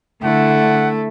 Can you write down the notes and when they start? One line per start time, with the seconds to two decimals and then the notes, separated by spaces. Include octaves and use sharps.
0.23 D3 A3 E4 A4 F#5